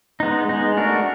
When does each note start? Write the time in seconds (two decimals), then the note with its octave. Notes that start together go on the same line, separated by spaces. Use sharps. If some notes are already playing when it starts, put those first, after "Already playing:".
0.20 G#3 B3 D#4
0.49 G#3 B3 D#4
0.77 A3 D4 F#4 A#4